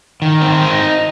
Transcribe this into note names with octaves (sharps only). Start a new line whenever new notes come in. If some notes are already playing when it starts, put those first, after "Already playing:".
D#3
C4
D#4